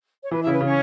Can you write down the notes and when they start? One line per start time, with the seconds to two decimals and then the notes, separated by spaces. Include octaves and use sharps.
0.24 C#5
0.31 E3 B4
0.42 C#3 E4 E5
0.53 B4
0.61 C#3 C#4 C#5